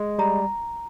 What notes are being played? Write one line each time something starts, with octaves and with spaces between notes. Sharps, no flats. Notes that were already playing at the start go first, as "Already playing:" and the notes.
Already playing: G#3
G3 A#5